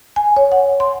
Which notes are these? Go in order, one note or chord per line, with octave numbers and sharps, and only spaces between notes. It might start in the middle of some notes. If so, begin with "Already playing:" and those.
G#5
C#5
F#5
C6